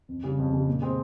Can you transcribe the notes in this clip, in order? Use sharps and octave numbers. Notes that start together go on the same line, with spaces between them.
F2
C#3 G3
F2
C#3 G3
A#2
G#3 C4